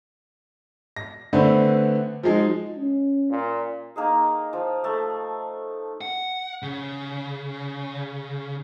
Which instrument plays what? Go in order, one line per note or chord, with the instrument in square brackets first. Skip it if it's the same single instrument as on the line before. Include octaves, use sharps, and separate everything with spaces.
[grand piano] A#6
D3 A3 B3 C4 B4 C5
F3 F#3 G#3 D#4
[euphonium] C#4
[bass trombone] A#2
[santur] A#3 D#4 G#4
F3
A3
[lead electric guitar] F#5
C#3